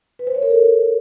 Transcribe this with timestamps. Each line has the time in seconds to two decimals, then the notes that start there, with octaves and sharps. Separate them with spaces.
0.19 B4
0.27 C5
0.35 C#5
0.42 A#4
0.50 A4